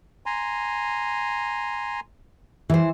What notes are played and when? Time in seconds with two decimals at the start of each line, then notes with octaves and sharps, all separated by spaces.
0.26 G#5 A#5 C6
2.70 E3 C5